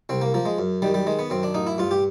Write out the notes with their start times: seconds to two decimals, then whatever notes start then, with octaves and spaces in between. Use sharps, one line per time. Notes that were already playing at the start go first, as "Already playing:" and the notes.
0.09 C2 C4
0.21 A#3
0.34 F3 A#3
0.45 G#3
0.59 F#2
0.82 D#3 G3
0.94 G3
1.07 D#3 G#3
1.19 B3
1.30 F#2 C4
1.43 D4
1.54 A1 D#4
1.67 E4
1.78 G2 F4
1.91 G4